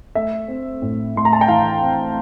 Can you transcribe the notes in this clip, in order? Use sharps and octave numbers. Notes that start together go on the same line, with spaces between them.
A3 E5
C4
A2
A2 C6
A#5
A5
G5
E3 F5
C4